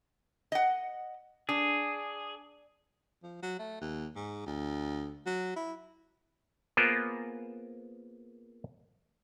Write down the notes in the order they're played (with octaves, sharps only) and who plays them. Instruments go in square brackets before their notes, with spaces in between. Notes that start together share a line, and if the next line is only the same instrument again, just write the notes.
[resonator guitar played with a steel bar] D#5 F#5
[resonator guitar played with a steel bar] D4 [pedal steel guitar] G#4
[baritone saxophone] F3
F#3
A3
D#2
G#2
D2
F#3
E4
[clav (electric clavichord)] A#3 B3 F4 G#4 A#4 C5